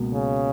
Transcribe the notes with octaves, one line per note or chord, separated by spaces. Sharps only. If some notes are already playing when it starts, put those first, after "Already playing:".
Already playing: C#2 B2 A#3
C#3